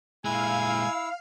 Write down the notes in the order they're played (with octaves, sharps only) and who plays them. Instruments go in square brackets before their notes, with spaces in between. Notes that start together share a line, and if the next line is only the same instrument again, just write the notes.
[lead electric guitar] A#2 G#3 [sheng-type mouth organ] E4 E6 [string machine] F5 [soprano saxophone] G#5